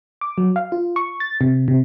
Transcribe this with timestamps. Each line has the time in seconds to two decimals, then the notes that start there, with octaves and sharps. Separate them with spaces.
0.21 D6
0.38 F#3
0.56 F5
0.72 F4
0.96 C#6
1.20 A6
1.41 C3
1.68 C3